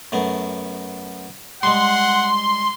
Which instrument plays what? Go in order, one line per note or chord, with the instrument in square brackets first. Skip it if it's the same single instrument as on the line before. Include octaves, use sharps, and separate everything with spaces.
[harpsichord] F#2 A3 B3
[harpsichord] G3 G#3 [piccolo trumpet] F#5 [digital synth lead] C6